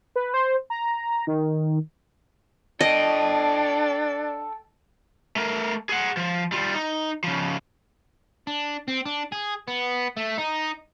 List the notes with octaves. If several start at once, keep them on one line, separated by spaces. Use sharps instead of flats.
B4
C5
A#5
D#3
D4 A4 D#5 G5
A3 A#4
G#4 F#5
F3
G3 F4
D#4
C#3 F3
D4
C4
D4
G#4
B3
A3
D#4